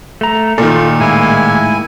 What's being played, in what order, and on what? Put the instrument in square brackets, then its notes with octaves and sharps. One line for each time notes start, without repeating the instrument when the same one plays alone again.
[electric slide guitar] A3 A#5
[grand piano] A#2 D#3 [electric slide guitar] F4 A4
[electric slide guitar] A2 G#3 A#3 [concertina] E4 G#5